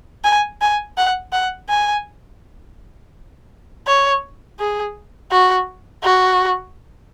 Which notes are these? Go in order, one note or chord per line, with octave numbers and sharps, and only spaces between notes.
G#5
G#5
F#5
F#5
G#5
C#5
G#4
F#4
F#4